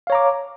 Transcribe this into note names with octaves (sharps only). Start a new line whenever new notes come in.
C#5 F5 A#5 D6